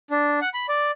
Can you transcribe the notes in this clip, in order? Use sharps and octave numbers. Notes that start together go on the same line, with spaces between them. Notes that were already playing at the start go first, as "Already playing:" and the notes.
D4
F#5
B5
D5